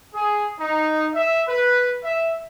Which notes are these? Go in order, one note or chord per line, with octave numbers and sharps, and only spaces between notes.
G#4
D#4
E5
B4
E5